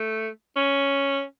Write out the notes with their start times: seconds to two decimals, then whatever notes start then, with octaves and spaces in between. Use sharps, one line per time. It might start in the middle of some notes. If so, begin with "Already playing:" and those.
Already playing: A3
0.57 C#4